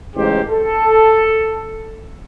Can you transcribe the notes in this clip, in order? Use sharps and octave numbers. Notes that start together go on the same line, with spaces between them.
A1 G#2 C#3 G#3 G4 C5
A4